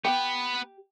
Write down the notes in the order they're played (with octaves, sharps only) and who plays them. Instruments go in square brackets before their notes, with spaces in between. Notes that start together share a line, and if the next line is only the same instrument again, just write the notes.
[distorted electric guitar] B3 B4 [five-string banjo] G4